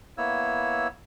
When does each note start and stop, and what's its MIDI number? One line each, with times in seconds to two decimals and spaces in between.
0.18 0.87 58
0.18 0.87 59
0.18 0.87 64
0.18 0.87 73
0.18 0.87 88